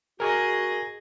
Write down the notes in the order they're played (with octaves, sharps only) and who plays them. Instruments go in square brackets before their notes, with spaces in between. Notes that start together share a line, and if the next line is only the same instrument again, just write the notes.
[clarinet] F#4 [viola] G#4 D#5 [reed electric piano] A#4 G#5